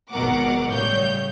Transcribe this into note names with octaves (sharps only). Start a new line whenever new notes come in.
G#1 B2 F#3 A#4 F#5 D6
A2 C#3 G3 C#5 G6